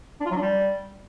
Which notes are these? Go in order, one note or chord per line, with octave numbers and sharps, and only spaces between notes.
D4
F4
F#3
D4
G3